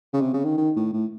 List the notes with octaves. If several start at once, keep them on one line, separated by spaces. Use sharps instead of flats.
C#3
C3
C#3
D#3
D#3
A2
A2